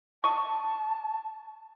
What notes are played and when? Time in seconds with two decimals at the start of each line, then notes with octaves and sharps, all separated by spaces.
0.24 D#5 A5 C#6